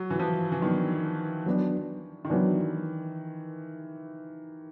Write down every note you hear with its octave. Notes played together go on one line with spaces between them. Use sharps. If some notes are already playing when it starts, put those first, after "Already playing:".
Already playing: F#3
E3
F3
E3
D#3 F#3 B3 D4
F#3 B3 D4
D#3
E3 F#3 B3 D4